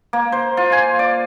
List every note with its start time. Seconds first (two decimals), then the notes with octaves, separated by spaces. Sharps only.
0.13 A#3
0.32 C5
0.57 F4
0.72 G#5
0.99 D5